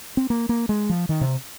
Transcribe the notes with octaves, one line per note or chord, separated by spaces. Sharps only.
C4
A#3
A#3
G#3
F3
D#3
C3